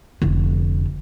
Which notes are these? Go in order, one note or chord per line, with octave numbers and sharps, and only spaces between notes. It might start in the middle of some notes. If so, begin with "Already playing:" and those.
F1 D3